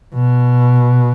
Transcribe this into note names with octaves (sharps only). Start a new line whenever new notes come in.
B2